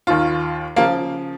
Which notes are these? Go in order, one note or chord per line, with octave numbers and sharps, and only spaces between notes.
D#2 D#3 F4
C#3 F3 A#3